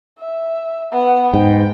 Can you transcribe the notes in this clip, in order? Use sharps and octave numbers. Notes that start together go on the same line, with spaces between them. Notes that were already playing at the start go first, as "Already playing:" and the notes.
E5
B3 F#5
G#2 G5